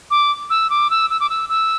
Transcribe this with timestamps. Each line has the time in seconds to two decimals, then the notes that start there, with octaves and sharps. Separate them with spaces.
0.11 D6
0.50 E6
0.70 D6
0.90 E6
1.10 E6
1.20 D6
1.30 E6
1.49 E6